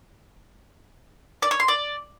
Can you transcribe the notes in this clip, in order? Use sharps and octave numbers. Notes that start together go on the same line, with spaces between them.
D5
C#5
C6
D5